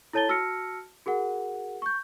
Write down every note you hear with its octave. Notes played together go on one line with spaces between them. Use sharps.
E4 A4 C#5 A5 A6 G7
F#4 A5 E6 F6 A#6 C#7
F#4 G#4 A#4 F#5
C#6 G6